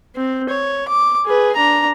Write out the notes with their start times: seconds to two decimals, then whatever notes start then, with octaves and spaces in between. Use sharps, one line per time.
0.16 C4
0.49 C#5
0.88 D6
1.26 G#4 B4
1.56 D4 A#5